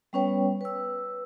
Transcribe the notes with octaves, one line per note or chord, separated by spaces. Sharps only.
G3 B3 C#4 B4 C#5 G5
B4 E6